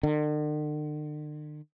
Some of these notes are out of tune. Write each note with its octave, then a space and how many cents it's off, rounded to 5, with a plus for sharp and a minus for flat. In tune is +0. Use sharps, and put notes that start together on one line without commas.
D3 +45